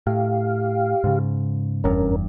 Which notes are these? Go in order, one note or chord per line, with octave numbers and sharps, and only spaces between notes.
A2 G4 F5
G#2 C#3
F1 E2 G2 C#4 A#4